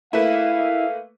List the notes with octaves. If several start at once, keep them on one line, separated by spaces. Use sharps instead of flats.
A3 A#3 E4 B4 F5